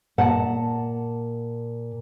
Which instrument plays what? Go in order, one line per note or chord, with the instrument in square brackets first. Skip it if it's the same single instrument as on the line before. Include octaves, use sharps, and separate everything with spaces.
[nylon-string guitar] A#2 F#5 A5